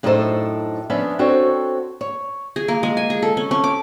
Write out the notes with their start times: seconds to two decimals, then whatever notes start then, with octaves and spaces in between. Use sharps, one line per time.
0.03 F#2 A2 D4 D#4 A4 C5
0.90 F3 B3 C#4 D4 E5
1.19 C4 D4 F#4 A4 C5 C#5
2.01 C#5
2.56 G#4
2.68 A#3
2.83 G#3
2.97 G#5
3.10 G#4
3.22 A4
3.37 C#4
3.51 C#4
3.64 D6